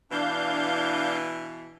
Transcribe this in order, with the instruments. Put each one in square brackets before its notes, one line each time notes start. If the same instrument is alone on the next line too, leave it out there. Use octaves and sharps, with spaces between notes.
[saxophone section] B2 E3 [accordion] D4 F5 G6